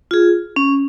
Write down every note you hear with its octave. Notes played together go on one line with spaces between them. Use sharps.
F4 G#4
C#4